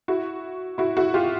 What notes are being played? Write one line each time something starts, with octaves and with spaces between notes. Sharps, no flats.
E4 F#4
E4 F#4
E4 F#4
F4 G4